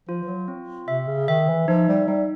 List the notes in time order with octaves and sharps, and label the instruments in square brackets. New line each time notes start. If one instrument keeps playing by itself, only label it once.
[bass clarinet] F3 [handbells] F4
[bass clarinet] F3
F#3
[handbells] C4
[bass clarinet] C3 [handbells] E5
[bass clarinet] C#3
[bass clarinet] D#3 [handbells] E5
[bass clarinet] E3
[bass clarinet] F3 [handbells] D#4
[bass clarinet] G3
[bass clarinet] G3 [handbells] D#4